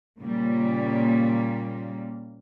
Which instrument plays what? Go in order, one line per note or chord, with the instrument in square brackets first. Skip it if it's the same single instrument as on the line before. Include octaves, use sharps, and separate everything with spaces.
[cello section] A#2 C#3 G3 A#3